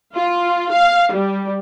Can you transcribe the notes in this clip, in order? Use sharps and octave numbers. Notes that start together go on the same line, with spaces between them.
F4
F5
G3